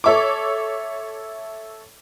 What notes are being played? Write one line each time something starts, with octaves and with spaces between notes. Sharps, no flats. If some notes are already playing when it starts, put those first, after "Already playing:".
A4 C#5 E5 C#6 D6